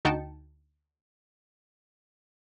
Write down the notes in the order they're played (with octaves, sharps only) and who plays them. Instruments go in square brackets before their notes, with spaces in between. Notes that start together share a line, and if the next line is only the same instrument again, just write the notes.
[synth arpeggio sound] D2 D#4 F#4 G5 A5 C#7